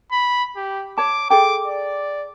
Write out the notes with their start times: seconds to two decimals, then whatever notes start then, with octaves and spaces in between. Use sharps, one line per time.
0.12 B5
0.56 G4
0.98 C#5 A5 D6
1.30 G#4 A4 G5 D6
1.67 D5